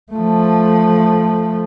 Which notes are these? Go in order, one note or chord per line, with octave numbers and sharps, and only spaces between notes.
F3 A3